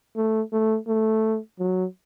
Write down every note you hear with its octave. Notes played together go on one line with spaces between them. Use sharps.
A3
A3
A3
F#3